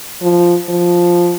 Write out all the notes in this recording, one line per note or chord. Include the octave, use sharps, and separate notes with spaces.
F3
F3